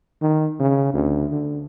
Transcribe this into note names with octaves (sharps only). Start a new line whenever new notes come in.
D#3
C#3
D2
D3